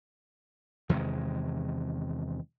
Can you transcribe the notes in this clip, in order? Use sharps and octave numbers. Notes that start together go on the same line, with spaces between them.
E2 C3 D#3 G#3